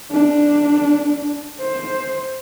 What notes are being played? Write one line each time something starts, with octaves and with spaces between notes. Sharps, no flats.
D4
C5